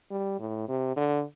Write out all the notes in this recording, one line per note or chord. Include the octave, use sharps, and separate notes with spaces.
G3
A2
C3
D3